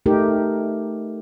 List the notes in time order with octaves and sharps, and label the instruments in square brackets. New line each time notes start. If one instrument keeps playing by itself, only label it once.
[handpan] A3 D#4 G4 A#4